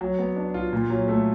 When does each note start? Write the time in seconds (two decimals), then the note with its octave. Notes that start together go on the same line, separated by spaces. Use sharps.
0.01 F#3
0.19 B3
0.36 D4
0.54 F4
0.73 A#2
0.90 F#3
1.08 A3